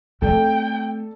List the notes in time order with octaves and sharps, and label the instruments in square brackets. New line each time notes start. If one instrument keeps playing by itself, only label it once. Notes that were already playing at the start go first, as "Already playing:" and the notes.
[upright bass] A3 C4 [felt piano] A4 D5 [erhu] G5